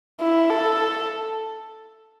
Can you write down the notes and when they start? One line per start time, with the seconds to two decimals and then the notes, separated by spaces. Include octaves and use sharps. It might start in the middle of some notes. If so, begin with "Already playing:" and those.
0.20 E4
0.50 A4